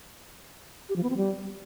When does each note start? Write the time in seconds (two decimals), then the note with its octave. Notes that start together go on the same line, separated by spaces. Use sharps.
0.89 G4
0.96 F3
1.03 B3
1.10 C4
1.17 G3